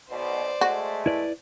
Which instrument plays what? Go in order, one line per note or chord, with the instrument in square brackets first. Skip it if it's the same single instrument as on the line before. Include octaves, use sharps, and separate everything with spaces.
[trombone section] B1 B2 [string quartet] C5 D5
[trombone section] G#3 A3 [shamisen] F#4
[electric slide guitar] E4 B4 D5